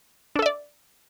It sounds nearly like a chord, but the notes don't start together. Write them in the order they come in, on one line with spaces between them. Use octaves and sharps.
D4 A4 E5 D5